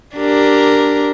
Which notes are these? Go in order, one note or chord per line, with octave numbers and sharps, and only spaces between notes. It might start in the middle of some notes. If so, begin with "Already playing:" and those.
D4 G4 A#4